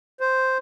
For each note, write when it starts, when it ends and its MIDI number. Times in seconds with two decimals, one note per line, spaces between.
0.21 0.58 72